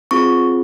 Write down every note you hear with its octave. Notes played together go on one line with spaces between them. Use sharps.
C4 F4 G#4 C#6